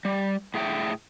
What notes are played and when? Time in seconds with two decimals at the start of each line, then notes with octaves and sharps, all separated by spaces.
0.05 G3
0.54 A2 G#4 E5 G5